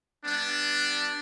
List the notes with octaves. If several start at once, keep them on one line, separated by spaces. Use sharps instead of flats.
G3 B3 D4